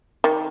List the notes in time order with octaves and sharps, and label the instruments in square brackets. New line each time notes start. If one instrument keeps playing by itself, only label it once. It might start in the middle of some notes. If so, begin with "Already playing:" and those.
[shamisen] D#3